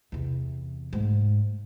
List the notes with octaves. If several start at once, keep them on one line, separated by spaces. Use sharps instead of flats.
E2 C3
G#2